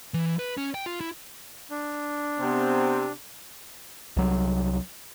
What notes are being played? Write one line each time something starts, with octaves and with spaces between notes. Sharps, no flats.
E3
B4
C#4
G5
F4
E4
D4
C3 B3 C4
C2 F#3